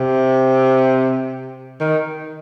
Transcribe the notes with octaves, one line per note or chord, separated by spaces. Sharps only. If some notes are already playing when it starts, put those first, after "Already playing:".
Already playing: C3
D#3